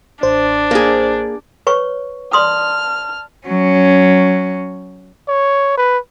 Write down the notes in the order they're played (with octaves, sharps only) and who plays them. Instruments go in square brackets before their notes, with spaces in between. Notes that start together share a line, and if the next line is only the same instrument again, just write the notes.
[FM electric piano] A1 C5 [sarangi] D4
[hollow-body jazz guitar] A#3 G#4
[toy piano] B4 C#5 C#6
[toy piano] D5 C6 D#6 [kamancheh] A5 F6
[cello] F#3 C#4
[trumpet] C#5
B4